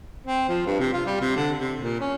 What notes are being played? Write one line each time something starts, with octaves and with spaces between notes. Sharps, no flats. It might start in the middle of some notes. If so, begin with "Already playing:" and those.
C4
F3
G2
C3
F4
G3
C3
D3
C3
A#2
C#4